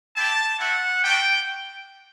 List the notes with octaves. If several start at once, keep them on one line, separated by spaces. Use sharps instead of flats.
C4 E4 G4 A5
A3 C4 E4 F#5
G3 D4 F#4 G5